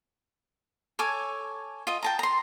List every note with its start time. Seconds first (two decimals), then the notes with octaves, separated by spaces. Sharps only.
0.99 A4 C#5 G#5 D6
1.87 F4 D#5
2.03 G5 A5 A#5
2.19 A#5 C6